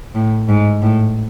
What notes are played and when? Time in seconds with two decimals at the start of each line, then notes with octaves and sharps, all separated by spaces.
0.15 A2
0.48 G#2
0.82 A2